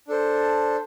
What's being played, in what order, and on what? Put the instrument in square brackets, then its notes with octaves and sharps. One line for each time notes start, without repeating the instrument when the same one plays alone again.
[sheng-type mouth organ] D4 A4 C5